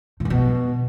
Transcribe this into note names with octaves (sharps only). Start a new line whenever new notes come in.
A#2
F#2
B2